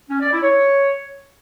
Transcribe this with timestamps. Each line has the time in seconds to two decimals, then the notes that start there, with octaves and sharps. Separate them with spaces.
0.09 C#4
0.20 D5
0.31 E4
0.43 C#5